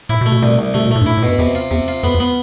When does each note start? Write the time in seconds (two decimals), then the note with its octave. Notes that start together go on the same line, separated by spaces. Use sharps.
0.09 A2 E4
0.21 B2
0.26 A3
0.32 B2
0.43 C2 B2
0.59 C2
0.74 C3 A3
0.86 B2
0.91 A2 A3
1.01 G2
1.06 A2 E4
1.17 A2
1.23 B2
1.28 G2
1.39 E2 C3
1.55 F4
1.71 E2 C3
1.88 F4
2.03 F2 B3
2.14 E2
2.20 B3